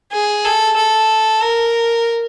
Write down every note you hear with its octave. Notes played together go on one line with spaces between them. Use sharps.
G#4
A4
A4
A#4